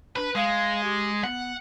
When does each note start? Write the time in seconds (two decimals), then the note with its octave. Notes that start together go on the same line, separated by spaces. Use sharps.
0.16 D4 B4
0.35 G#3 F5
0.84 G4
1.24 B3 F#5